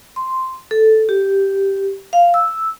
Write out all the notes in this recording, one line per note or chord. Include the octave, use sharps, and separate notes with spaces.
C6
A4
G4
F5
E6